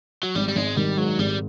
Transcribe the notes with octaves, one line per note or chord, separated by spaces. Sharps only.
F#3
G#1 G3
G3
G#1 G#3
D#3 G3
G#2 F#3
G#1 G3